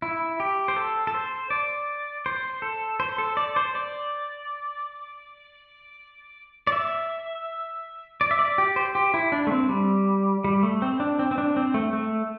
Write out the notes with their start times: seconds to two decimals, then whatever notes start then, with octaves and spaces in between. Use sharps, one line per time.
0.02 E4
0.40 G4
0.68 C5
0.76 A4
1.07 A4
1.14 C5
1.50 D5
2.26 C5
2.62 A4
3.00 C5
3.18 A4
3.37 D5
3.56 C5
3.75 D5
6.67 D5
6.72 E5
8.21 D5
8.31 E5
8.39 D5
8.58 G4
8.76 C5
8.95 G4
9.14 E4
9.32 D4
9.47 A3
9.52 C4
9.69 G3
10.44 G3
10.63 A3
10.82 C4
11.00 D4
11.19 C4
11.31 C4
11.38 D4
11.57 C4
11.74 A3
11.93 A3